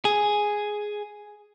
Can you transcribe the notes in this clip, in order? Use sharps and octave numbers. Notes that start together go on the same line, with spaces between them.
G#4